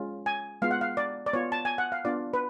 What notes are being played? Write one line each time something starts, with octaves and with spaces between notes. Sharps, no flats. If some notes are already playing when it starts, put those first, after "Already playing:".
Already playing: G#3 C#4 F4
G#5
G#3 B3 F4 F5
F#5
F5
D5
D5
B3 F4 C#5
A5
G#5
F#5
F5
B3 D4 F4 D5
B4